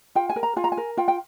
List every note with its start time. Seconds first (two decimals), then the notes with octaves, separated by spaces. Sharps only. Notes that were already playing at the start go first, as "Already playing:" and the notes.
0.15 F4 G5
0.29 G#5
0.36 A#4
0.43 A#5
0.56 F4 G#5
0.64 A#5
0.72 G#5
0.77 A#4
0.97 F4 G5
1.08 G5